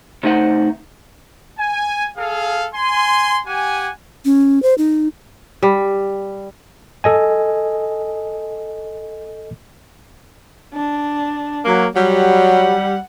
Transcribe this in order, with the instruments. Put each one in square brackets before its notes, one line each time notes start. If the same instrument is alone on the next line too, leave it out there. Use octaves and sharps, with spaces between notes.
[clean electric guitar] C3 A3 D#4 C5 F#5
[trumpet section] G#5
G#4 A4 F5
G#5 C6
G4 F#5 G#5
[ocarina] C#4
C5
D#4
[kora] G3
[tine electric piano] A4 D#5 G#5
[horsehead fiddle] D4
[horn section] F#3 A#3
[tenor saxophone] F#3 [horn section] G3 [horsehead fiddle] F#5